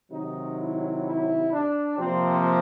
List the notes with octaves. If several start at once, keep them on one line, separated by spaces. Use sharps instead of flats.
C3 D#3 F#3 D#4
E4
E4
D4
C3 F3 A#3 C4